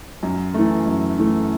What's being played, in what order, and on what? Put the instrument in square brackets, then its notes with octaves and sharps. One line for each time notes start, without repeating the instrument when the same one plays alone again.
[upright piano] F#2
E3 A3
F#2
E3 A3